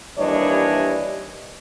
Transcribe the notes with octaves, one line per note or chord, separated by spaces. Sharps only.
D#2 E3 G3 D4 C#5 D#5